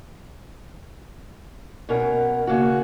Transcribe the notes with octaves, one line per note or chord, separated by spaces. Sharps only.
B2 C#4 A#4 F#5
C#3 A#3 F#4